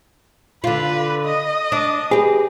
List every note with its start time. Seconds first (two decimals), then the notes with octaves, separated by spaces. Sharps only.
0.64 D3 F4 B4
1.24 D#5
1.72 D4
2.11 G4 G#4 B4